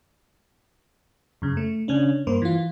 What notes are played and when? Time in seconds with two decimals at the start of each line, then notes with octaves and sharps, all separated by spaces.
1.42 F#2 C#3
1.57 A3
1.88 C#3 C#4 D4
2.27 G2 A#3 C5
2.42 E3 F4